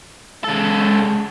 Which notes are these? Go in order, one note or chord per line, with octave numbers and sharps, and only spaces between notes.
C#3 G#3 A4